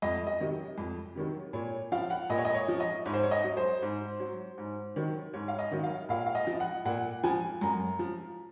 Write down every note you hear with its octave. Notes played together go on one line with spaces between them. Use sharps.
F2 D#5
D#5
C3 D#3 F#3
F2
C3 D#3 F#3
A#2 C#5
F3 F5
F#5
A#2 D#5
C#5
D#5
C#5
F3
D#5
G#2 C#5
C5
C#5
D#5
F#3
C5
G#2
F#3
G#2
D#3 F#3
G#2 C#5
F5
D#5
D#3 F#3
F5
A#2 F5
F5
D#5
F3
F#5
A#2 F#5
F3 G#5
F#2 A#5
F3